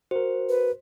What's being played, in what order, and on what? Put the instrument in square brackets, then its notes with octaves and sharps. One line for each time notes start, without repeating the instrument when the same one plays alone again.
[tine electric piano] F#4 A#4 [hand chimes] C5
[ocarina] B4